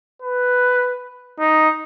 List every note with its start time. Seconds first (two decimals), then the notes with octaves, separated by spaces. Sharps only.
0.22 B4
1.39 D#4